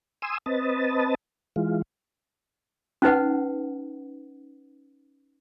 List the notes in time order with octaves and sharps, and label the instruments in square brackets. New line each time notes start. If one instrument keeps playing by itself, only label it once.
[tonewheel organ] G#5 C6 D#6 E6
C4 B4 D#5 A5
E3 G#3 F4
[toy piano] C#4 D#4 B4 F#5